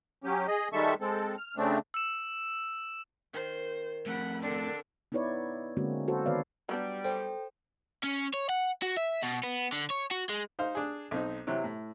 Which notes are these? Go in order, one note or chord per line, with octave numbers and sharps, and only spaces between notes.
F#3 C#4 G4
G#4 D#5
D#3 G3 G#3 A4 E5 C#6
G#3 C4 A4
F6
C#3 A3 C4 D4
E6 E7
D#3 C5
F2 A2 F#5 B5
D3 C4 D4 A4 A#4
B3 D#4 E4 B4 C#5 D5
D3 G#3 A#3 C4 C#4 F#4
F#4 A4 C5
D#3 B3 B4 C#5 D5 F5
F#3 G3 B3 D4
A4 C5 G5
C#4
C#5
F#5
F#4
E5
B2
B3
D3
C#5
F#4
G#3
D#4 C5 F5
D4 G#4
B1 C4 D#4
C3 E3 F#3
A2